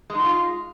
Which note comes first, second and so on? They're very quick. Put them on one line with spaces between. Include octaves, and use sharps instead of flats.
G#3 D#4 F#4 F4